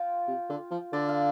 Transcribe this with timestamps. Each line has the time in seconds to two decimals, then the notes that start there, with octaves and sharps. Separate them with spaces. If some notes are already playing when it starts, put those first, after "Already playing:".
Already playing: F4 F5 G5
0.27 C3
0.49 D3
0.71 F3
0.93 D3 D5
1.09 F5